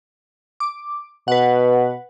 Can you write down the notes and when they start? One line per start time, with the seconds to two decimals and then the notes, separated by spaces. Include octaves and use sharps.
0.60 D6
1.28 B2 B4 F#5